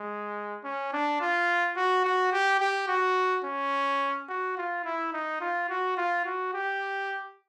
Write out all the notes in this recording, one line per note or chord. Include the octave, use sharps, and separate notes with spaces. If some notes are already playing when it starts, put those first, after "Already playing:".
Already playing: G#3
C#4
D4
F4
F#4
F#4
G4
G4
F#4
C#4
F#4
F4
E4
D#4
F4
F#4
F4
F#4
G4